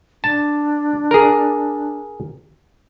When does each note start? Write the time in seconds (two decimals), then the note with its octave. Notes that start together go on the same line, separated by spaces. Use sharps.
0.24 D4 A5
1.11 G#4 A#4